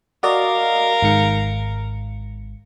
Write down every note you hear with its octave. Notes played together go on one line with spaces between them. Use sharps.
F#4 A#4 D5 D#5 F5
G#1 G#2 C#7